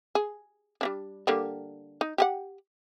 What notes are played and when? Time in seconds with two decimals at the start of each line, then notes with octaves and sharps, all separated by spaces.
0.15 G#4
0.81 G3 C#4 D4
1.27 D3 G3 A#3
2.01 D#4
2.18 G4 G#4 F#5